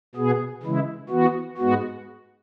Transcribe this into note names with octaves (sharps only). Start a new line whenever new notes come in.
B2 B3 G#4
C#3 E3 G#3 E4
E3 B3 F#4
G#2 G#3 B3 F#4